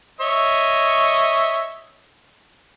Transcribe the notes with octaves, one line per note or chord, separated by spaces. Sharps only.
C#5 D#5 E5